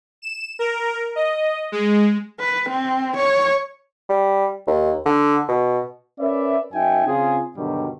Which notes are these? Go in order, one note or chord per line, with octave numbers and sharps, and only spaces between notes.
E7
A#4
D#5
G#3
B4
C4
C#5
G3
D#2
D3
B2
C#4 A#4 B4 D5 E5
F#2 D#4 E5 G5 G#5
C#3 C4 F4 G#4
G2 B2 D3 D#3 F#3 G3